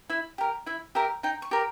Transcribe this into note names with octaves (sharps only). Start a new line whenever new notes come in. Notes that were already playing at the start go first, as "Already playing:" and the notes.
E4 E5
G4 A#4
E4 E5
G4 A#4 E5
D#4 G5
C#6
G4 A#4